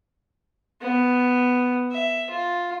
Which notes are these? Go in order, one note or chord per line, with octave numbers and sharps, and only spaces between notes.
B3
E5
F4